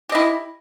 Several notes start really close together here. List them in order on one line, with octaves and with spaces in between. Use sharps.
G4 D#5 E4